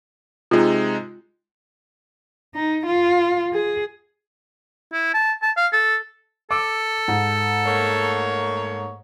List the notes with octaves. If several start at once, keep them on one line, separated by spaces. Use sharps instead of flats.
C3 G#3 D#4 F4
D#4
F4
G#4
E4
A5
A5
F5
A4
A4 D6 E6
G#2
A3 A#3 C#5